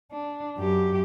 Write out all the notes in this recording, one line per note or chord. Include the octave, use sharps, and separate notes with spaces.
D4
F#2 G4